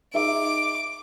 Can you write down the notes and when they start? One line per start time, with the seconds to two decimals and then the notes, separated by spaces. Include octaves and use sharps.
0.14 D#4 G#4 E5 D6